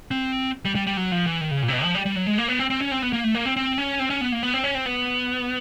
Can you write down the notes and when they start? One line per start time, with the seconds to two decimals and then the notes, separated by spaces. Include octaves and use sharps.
0.11 C4
0.65 G3
0.75 G3
0.87 G3
0.97 F#3
1.12 F3
1.26 E3
1.41 D#3
1.51 C#3
1.62 A#2
1.68 C3
1.73 B2
1.84 F3
1.95 G3
2.06 G3
2.16 F#3
2.26 G#3
2.38 A#3
2.48 B3
2.59 C4
2.70 C4
2.81 C#4
2.91 C4
3.02 B3
3.13 A#3
3.24 A3
3.35 A#3
3.46 C4
3.57 C4
3.78 C#4
3.99 C4
4.10 C#4
4.21 B3
4.32 A#3
4.43 B3
4.54 C4
4.64 C#4
4.75 C4
4.86 B3